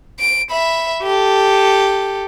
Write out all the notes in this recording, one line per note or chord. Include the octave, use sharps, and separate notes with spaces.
D7
E5 B5
G4 A4